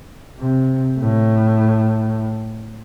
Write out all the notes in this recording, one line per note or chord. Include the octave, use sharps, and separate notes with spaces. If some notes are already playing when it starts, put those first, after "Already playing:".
C3
A2